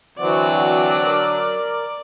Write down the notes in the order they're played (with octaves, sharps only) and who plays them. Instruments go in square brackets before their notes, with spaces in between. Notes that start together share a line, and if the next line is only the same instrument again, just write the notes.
[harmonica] D3 F#3 [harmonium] E3 C4 F#4 [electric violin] D5
[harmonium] A#4